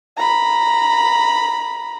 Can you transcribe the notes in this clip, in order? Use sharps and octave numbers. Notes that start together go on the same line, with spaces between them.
A#5 B5